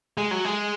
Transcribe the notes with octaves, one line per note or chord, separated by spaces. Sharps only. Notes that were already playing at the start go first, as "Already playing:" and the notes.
G#3
F#3
G#3